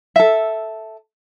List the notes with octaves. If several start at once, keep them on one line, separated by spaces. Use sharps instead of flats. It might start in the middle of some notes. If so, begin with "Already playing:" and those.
A4 E5